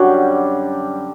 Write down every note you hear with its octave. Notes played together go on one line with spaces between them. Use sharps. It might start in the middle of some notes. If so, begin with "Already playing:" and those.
Already playing: F#2 D3 G3